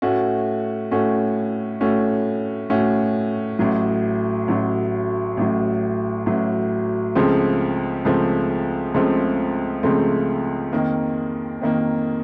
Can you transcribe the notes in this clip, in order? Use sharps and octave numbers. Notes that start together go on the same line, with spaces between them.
A2 A3 C#4 F#4
A2 A3 C#4 F#4
A2 A3 C#4 F#4
A2 A3 C#4 F#4
A1 A2 F#3
A1 A2 F#3
A1 A2 F#3
A1 A2 F#3
C#2 C#3 F3 A3 C4
C#2 C#3 F3 A3 C4
C#2 C#3 F3 A3 C4
C#2 C#3 F3 A3 C4
F2 D#3 A#3
F2 D#3 A#3